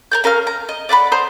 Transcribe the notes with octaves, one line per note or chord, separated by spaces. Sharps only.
A#4 D5 G6
C#4 A#4 F5 F6
A#5
D#5
D5 E5 F#5 B5
C5 A#5 D#6